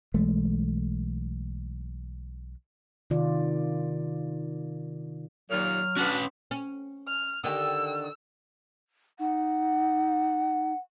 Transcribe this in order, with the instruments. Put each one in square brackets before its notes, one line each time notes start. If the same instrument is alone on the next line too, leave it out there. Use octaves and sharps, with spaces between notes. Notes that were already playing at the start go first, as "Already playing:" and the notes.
[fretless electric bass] B1 E3 G#3 A3
[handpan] C3 D#3 F4 D5
[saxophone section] D#2 A#2 [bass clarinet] F#3 [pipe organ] F6
[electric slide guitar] C#4 B4 [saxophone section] D4 F#4
[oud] C#4
[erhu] F6
[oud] D3 D#3 G4 [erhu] E6
[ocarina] D#4 [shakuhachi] F#5